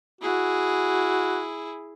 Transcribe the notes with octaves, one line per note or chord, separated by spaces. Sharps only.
E4 F#4 G#4